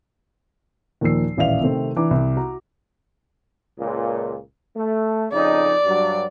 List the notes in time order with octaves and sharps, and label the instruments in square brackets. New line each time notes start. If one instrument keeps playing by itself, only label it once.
[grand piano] D#2 A#2 F3 E6 C7
D#1 A1 D5 E5 F5 F7
C3 D#3 A3 C4
E3 D4 A#5 D6
C2
F#4 A#5
[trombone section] C#2 A#2
A3
[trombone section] F2 C#3 D#4 [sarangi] D5
[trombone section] G2 F#3